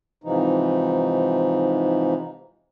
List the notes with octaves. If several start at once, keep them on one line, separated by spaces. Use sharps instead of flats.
G#2 C3 E3 F3 D#4